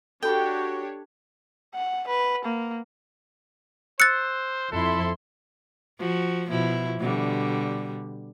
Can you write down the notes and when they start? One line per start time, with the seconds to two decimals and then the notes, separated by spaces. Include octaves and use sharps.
0.23 D4 F#4 G4 A4 C#5 G5 A5 B5
1.75 F#5
2.08 B4
2.45 A#3
4.00 C5 E6 F#6 A6 C#7
4.72 F2 E4 A4 C6
5.98 F3 F#4
6.48 B2 F3 E4
7.00 B2 D3 G3